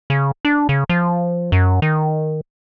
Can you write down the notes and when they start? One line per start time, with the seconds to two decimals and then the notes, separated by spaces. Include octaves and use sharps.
0.10 C#3
0.45 D4
0.69 C#3
0.89 F3
1.52 F#2
1.82 D#3